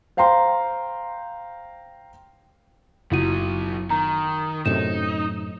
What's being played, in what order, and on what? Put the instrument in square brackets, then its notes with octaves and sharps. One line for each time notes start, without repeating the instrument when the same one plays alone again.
[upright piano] C5 F5 G5 A#5 C6
[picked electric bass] F#1 [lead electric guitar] B2 F#3 [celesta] E4 F4 D#7
[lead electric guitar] D#3 [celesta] A#5
[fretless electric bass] F#2 A2 C3 [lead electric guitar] D#4 [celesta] E7